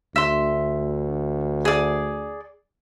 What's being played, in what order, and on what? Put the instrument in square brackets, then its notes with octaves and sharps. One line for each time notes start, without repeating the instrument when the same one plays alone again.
[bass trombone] D2 [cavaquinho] E5 C6
[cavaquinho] G#4 D5